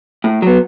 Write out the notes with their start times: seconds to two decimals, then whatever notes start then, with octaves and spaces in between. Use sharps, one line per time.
0.24 A2
0.42 F#3 B3